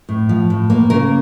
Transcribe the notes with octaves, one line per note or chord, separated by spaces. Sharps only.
A2
F3
A2
A#3
C#3 A#4